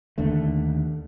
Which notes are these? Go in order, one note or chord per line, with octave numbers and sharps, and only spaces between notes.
D#2 D3 A3